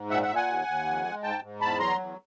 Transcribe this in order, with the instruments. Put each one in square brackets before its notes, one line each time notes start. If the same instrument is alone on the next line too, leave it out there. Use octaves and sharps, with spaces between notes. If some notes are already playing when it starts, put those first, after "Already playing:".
Already playing: [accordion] G#2
A#2 E5 F#5
E5 F#5
A#2
F#5 G#5
D#2
D#2
F2
G#3
G#2 G5 A5
G#2
E2 A5 B5
F#3 A#5 C6
E2